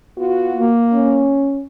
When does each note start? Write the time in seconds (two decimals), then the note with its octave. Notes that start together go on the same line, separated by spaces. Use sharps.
0.18 B3 F4 F#4
0.53 A#3
0.93 C#4